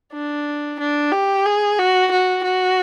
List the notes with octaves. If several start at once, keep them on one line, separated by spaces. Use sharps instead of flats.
D4
D4
G4
G#4
F#4
F#4
F#4